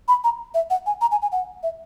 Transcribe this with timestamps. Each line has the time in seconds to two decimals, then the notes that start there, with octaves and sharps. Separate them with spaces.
0.08 B5
0.24 A#5
0.54 E5
0.70 F#5
0.86 G#5
1.01 A#5
1.12 G#5
1.22 G#5
1.32 F#5
1.63 E5